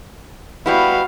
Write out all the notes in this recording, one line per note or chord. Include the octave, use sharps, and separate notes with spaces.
G3 B3 E4 F#4 F5